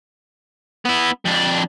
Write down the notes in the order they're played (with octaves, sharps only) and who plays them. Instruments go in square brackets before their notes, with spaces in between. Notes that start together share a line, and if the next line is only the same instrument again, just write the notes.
[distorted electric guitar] B3 E4
F2 D4